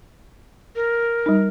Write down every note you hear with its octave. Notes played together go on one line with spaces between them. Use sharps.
A#4
G3 D#4